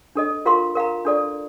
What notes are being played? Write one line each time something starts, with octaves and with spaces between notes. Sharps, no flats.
D4 A4 D#5
F4 A#4 F5 C6
A#4 F5 A#5
D4 A4 D5